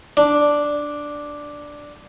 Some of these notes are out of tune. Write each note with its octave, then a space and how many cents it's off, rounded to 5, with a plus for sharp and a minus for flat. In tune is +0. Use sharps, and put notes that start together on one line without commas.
D4 +0